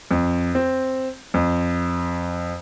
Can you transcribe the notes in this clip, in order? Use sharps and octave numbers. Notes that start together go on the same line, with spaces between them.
F2
C4
F2